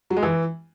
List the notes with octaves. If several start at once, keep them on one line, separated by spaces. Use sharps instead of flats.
F#3
G#3
E3